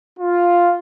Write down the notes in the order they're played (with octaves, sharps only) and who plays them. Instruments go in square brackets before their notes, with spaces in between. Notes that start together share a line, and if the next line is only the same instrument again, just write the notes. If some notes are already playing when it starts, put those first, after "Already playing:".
[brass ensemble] F4